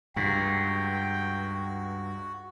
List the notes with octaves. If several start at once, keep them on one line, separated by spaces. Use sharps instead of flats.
C#2 G2 F#4 G5